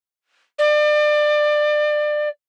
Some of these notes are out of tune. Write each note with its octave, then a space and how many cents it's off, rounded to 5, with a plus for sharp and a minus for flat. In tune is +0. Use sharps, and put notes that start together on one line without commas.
D5 +30